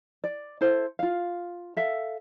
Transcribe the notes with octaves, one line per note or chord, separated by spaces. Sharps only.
D5
E4 A4 C5
F4 F5
A4 E5 F5